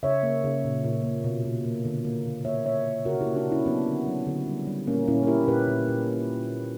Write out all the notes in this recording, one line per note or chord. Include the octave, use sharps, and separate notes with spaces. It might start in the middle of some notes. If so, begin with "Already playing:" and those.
C#3 C#5 E5
A#3
C#3
A#2
A#2
A#3
B2
B2
A#3
D3
A#3
D3
A#3 C#5 E5
A#3 C#5 E5
A#3
C#3 F#4 A#4
E4 G4
A#3
D4 F#4
C#3 C#4 E4
F#3 B3 D4
D3
F#3
D3
G3
G3
A#2 A#3 C#4
A#2 C#4 E4
A#4
A#3 E4 G4
A#2 G4 B4
A#2
A#2